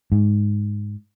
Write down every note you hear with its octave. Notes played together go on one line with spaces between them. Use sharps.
G#2